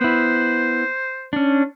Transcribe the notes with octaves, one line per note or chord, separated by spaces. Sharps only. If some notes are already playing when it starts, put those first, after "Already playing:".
B3 E4 C5
C#4 D4